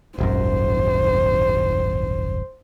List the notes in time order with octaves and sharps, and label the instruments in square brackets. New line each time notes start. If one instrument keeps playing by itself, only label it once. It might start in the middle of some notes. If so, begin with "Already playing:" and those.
[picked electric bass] D#1 G#1 F#2 [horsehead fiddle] C5